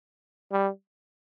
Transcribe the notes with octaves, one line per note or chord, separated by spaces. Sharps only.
G3